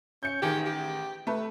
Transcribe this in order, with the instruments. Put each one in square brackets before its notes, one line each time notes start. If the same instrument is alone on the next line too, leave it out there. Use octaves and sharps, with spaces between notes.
[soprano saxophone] C#4 [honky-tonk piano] G6 C#7
[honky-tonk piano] A1 D#3 G#4 [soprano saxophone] G4
[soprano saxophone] G4
[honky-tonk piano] A3 B4